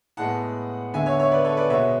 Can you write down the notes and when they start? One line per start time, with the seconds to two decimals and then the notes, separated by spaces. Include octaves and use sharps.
0.17 A2 G#3 B3 F#5 A5
0.94 D3 G#3 B3 E5 G#5
1.06 C#5 E5
1.20 C#5 E5
1.31 B4 D5
1.45 A4 C#5
1.57 B4 D5
1.70 B2 G#3 B3 C#5 E5